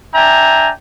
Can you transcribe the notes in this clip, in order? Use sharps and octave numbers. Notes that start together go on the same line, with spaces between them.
D4 E5 G5 G#5 A#5